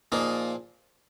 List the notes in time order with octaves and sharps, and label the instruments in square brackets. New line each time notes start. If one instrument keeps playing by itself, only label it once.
[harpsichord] A#2 F3 A#3 D#4 G#4